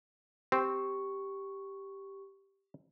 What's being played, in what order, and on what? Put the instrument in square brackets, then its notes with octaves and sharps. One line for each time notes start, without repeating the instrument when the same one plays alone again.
[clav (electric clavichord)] C4 [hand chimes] G4 C#6